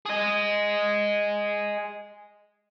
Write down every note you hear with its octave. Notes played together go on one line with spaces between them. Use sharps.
G#4 D#5